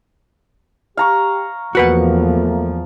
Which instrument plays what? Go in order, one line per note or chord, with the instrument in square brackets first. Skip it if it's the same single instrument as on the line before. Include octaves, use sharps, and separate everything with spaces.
[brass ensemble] G4 [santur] F5 A#5 C#6
[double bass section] E2 F3 [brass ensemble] A3 A#3 [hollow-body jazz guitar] F#4 B4 F#5